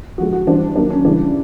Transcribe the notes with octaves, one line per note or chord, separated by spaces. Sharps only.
D3 F3 G#3 F#4
F#4
E3 G3 C4 D4
D#3 F#3 A#3 D4
C#4
C#3 E3 G3 D4